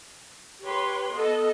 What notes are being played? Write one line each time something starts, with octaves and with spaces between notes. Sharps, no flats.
G4 B4 C#5 C6
B3 A4 D#5